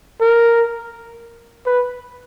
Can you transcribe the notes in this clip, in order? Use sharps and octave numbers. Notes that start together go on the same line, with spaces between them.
A#4
B4